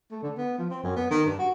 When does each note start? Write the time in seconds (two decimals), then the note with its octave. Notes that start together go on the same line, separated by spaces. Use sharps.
0.11 A3
0.23 D3
0.37 B3
0.58 F3
0.70 C4
0.84 F#2
0.96 B3
1.11 D#3
1.26 G2
1.39 F#4